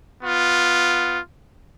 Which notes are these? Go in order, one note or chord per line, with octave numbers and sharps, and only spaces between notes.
B3 F4